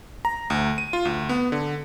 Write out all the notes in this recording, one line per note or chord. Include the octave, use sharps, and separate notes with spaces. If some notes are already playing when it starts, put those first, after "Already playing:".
A#5
D2
D#7
F4
D2
B3
D3